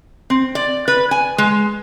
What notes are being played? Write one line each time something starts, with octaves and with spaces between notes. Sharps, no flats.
C4
D5
B4
G#5
G#3